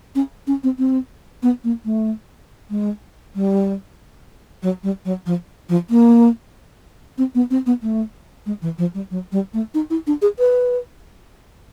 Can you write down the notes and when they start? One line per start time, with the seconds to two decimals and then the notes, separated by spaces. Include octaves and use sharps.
0.15 C#4
0.47 C#4
0.63 C4
0.78 C4
1.43 B3
1.64 A#3
1.85 A3
2.70 G#3
3.35 G3
4.63 F#3
4.83 G3
5.05 F#3
5.26 F3
5.69 F3
5.90 A#3
7.18 C4
7.35 B3
7.50 C4
7.66 B3
7.82 A3
8.46 G#3
8.62 E3
8.78 F3
8.94 G3
9.11 F#3
9.32 G3
9.54 A3
9.74 D#4
9.90 E4
10.07 D4
10.22 G#4
10.39 B4